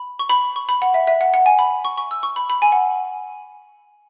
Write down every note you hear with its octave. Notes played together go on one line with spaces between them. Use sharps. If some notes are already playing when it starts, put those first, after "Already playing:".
Already playing: B5
C#6
B5
C#6
B5
F#5
E5
E5
F#5
F#5
G#5
B5
C#6
C#6
E6
C#6
B5
B5
G#5
F#5